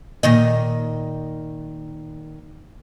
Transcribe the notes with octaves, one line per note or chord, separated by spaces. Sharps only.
A#2 D#3 D#5